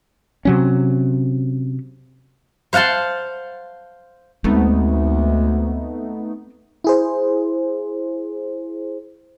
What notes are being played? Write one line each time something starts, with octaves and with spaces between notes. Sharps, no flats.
C3 F#3 C#4
C5 F5 F#5 A5 C6
D2 G#3 A3 B3 C4 D#4
E4 G#4 C5